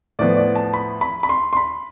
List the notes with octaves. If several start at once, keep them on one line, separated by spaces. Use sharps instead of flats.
A2 F3 B3 D5
D5
A5
B5
B5
B5
C6
C6
B5